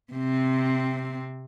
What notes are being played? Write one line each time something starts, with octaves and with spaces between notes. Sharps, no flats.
C3 C4